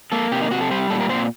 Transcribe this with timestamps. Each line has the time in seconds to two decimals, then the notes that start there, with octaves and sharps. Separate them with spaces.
0.12 A#3 A4
0.32 C3 G4
0.41 D#4
0.51 C3 F#4
0.61 A4
0.70 G3 C5
0.90 A#2 A4
1.01 A#4
1.09 C4 C5